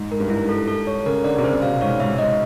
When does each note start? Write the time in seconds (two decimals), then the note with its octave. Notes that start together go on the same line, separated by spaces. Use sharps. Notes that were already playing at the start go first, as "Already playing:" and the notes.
Already playing: G#2
0.11 G#2 A#4
0.20 G2
0.28 G#2 E4
0.49 A4
0.68 A4
0.87 C#5
1.06 C#3 A#4
1.24 D3 D5
1.39 C3
1.43 C#3 C5
1.53 C3
1.62 B2 F5
1.81 G#2 C#5
2.00 G#2 E5
2.18 D#5